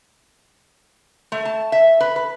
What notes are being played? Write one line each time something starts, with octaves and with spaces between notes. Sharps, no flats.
A3
A5
E5
B4
B4